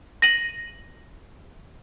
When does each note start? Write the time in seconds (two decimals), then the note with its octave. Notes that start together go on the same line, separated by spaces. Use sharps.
0.22 A#6 D#7 F#7